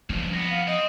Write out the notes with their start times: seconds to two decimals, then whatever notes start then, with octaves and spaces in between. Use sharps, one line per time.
0.10 C#2 G2 F3
0.33 C2 B3 A#6
0.51 F5
0.67 C4 D#5